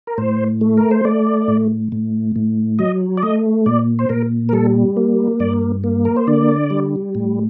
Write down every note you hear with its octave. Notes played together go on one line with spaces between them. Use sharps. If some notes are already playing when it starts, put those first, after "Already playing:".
A#4
A2 C5
A3
A#4
C5
A3 D5
A2
A2
A2
F#3 D#5
D5
A3 D#5
A#2 D5
C5
A#2 A#4
A#4
G3 A4
A#3
G2 D5
A#3
A#4
C5
D3 D5
G3
A2